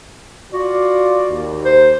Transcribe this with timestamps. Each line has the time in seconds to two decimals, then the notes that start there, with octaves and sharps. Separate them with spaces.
0.53 F4 F#4 D5
1.29 D#2
1.65 C5